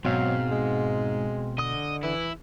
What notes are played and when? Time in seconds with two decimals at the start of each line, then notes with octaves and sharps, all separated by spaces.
0.05 G#2 B2 F#3 C4 F5
0.52 G#3
1.58 D3 D#5 D#6
2.03 E3 E4